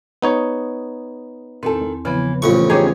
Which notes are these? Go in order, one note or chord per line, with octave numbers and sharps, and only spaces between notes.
B3 D#4 C#5
E2 D#3 C4 A4
C#3 E3 F3 B3
A1 F2 A#2 C#6
B3 C#4 D#4 G4 G#4 C#5 G#6